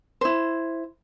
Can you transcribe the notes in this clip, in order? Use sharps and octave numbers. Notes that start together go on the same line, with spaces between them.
E4 C5